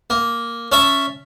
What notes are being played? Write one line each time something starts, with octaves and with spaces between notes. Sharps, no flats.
A#3
C#4 E5 A5